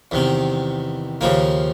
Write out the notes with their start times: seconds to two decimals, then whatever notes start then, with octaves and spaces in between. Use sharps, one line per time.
0.11 E2 C3 D#3
1.21 D#2 C#3 F3 A#3